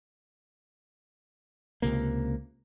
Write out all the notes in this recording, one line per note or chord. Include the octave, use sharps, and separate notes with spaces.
C#2 C3 A#3